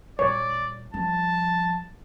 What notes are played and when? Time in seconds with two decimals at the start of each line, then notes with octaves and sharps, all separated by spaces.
0.19 A#2 G3 C#5 D5
0.94 F3 G3 A5